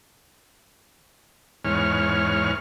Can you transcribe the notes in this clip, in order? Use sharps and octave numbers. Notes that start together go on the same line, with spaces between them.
E2 G#2 C#5 F6